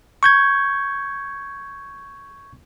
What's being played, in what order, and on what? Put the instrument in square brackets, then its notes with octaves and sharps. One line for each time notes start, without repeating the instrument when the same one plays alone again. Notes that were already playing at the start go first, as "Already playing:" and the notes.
[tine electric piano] C#6 G6 G#6